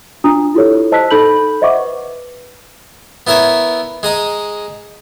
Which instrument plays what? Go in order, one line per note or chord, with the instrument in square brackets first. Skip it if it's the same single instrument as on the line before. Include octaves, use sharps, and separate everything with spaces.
[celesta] D4 F4 A#5 D#6
E4 F4 G4 A4 C#5
C5 D#5 A5 E6 F#6 B6
D#4 A4 B5 G6 F#7
C5 D#5 E5 F#5 C#6 D6
B4
[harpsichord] B3 E4 A#4 C#5 E5
G#3 D#5 A#5